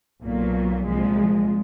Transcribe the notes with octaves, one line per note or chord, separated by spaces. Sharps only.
B1 A#2 F#3 A#3
C2 A#2 F3 G#3